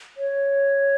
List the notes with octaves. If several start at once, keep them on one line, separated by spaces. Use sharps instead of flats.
C#5